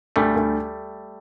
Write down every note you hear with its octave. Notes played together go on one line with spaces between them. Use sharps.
D2 G3 A3
D2